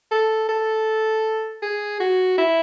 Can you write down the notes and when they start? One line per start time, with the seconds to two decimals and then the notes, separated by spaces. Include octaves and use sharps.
0.11 A4
0.49 A4
1.62 G#4
2.00 F#4
2.38 E4